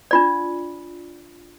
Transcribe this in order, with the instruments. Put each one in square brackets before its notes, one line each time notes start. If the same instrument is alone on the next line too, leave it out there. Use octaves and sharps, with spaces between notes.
[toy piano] D4 F4 D5